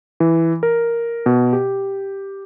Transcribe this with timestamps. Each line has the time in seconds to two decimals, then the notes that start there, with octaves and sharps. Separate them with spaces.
0.20 E3
0.63 A#4
1.26 B2
1.53 G4